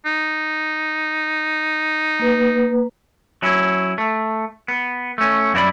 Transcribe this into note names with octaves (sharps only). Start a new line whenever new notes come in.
D#4
A#3 B4
F#3 C#4 E4
A3
B3
A3 C#4
F#2 A#3 E4 F#4 D5 B5